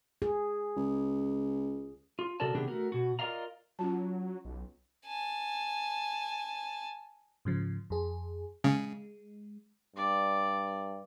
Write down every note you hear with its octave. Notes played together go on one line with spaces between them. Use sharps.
G#4
C#2
F4
C3 F#4 A4 A#4 D5 A5
C3 D#3 B3 D4 G4 G#4
A3 F#4 A#4
B2 F#4
F4 A#4 D5 D#5 F5 A#5
F#3 C#4 F4 A5
B1
G#5 A5
G#2 C#3 F3
F2 G#4
C#3 G#3
G2 D5